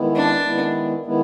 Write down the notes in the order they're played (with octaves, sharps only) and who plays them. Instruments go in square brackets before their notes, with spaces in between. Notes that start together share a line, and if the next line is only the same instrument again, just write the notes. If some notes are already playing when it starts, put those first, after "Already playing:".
Already playing: [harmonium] D#3 G#3 B3 E4
[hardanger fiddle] D4
[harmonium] D#3 G#3 B3 E4
D#3 G#3 B3 E4